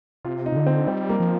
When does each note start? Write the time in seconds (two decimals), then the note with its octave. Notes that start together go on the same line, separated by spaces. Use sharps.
0.25 C3 F4
0.46 D#4
0.52 C3
0.56 D3
0.67 C4
0.87 G3 C4
1.09 A#3
1.20 F3